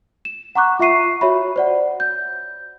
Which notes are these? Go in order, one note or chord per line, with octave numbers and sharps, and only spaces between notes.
E7
F#5 A#5 C#6 D6 F#6
F4 E5 C#6 C7 D#7
F#4 C#5 E5 B5
C5 D5 F#5
G6